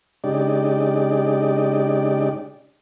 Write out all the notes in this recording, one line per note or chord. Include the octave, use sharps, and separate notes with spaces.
C#3 G#3 D4 D#4 G4 D5